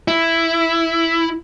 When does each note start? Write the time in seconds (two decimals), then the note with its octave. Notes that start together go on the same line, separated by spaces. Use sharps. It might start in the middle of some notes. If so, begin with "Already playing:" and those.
0.08 E4